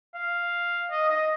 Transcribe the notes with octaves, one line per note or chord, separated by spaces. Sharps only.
F5
D#5
D#5